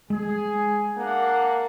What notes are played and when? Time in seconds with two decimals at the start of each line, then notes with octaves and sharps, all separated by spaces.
0.10 G#3 G#4
0.97 A#3 D4 F#5